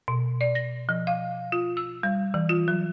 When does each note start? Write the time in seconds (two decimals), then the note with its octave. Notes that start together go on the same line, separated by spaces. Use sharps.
0.08 B2
0.41 D5
0.55 A#6
0.89 F3
1.07 F5
1.52 F4
1.77 E6
2.03 G3
2.34 E3
2.49 F4
2.68 F#3